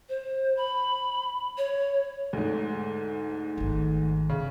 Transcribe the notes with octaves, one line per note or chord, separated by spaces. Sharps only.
C5
B5
C#5
D2 G#2
G#1 D#3
C#3